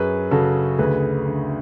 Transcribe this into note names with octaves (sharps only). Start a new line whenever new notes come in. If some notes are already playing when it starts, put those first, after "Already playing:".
Already playing: F#2 G#4 B4
C#3 F#4 A4
D2 G#4 B4
D3